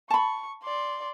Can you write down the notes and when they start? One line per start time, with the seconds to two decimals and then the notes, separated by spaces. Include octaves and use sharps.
0.10 A5 B5 C#6
0.63 D5 C6